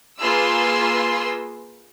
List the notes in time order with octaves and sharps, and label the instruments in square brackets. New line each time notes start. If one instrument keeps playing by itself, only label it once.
[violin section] A#3 F4 G#4 B4 C6 E6